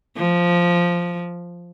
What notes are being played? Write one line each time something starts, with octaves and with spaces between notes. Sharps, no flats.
F3